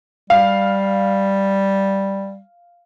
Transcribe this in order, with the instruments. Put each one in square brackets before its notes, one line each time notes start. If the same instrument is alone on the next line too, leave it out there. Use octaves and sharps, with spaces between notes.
[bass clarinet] G3 [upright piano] F5